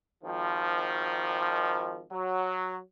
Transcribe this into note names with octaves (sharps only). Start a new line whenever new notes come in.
G#1 D#3 F3
F#3